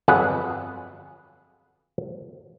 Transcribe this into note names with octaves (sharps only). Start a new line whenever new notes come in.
G1 F2 F#3 G#4 B4 F#5